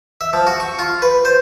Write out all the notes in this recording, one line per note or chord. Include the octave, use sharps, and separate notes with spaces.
E5
F3
F#4
C#6
F4
B4
C5